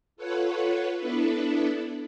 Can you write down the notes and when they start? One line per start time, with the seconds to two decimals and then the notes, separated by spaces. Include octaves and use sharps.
0.16 F4 A4 B4 C#5 F#5
0.97 B3 D4 E4 A4 B4